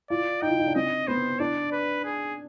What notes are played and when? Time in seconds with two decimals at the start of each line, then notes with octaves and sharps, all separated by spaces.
0.10 F4 D5
0.42 D#4 G5
0.50 F4
0.60 D#4
0.67 D4
0.75 C4 D#5
1.08 B3 C5
1.39 D4 D5
1.72 B4
2.05 G#4